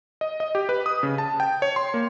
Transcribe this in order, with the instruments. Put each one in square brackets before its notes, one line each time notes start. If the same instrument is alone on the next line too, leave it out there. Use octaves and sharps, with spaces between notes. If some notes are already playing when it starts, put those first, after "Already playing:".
[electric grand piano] D#5
D#5
G4
B4
D#6
C#3
A5
G5
C#5
C6
A#3